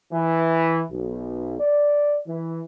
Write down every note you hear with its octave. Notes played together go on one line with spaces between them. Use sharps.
E3
B1
D5
E3